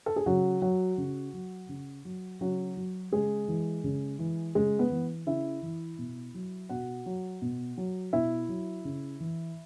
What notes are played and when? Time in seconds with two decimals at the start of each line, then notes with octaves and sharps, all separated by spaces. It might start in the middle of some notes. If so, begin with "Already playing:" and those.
0.06 A4
0.16 G#4
0.26 C#3 F#3 F#4
0.62 F#3 F#4
0.98 C#3
1.34 F#3
1.69 C#3
2.05 F#3
2.41 C#3 F#3 F#4
2.77 F#3
3.12 C#3 G#3 G#4
3.48 E3
3.84 C#3
4.19 E3
4.55 C#3 G#3 G#4
4.79 B3 B4
4.91 E3
5.27 C#3 E4 E5
5.62 E3
5.99 B2
6.34 F#3
6.69 B2 F#4 F#5
7.06 F#3
7.42 B2
7.77 F#3
8.13 B2 E4 E5
8.49 F#3
8.85 C#3
9.20 E3